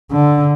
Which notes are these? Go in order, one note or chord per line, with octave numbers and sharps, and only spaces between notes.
D3